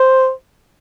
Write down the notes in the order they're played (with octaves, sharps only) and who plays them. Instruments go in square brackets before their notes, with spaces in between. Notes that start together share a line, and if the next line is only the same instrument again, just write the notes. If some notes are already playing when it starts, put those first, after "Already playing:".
Already playing: [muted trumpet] C5